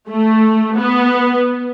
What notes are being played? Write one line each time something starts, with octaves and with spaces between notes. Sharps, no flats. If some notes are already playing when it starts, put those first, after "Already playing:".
A3
B3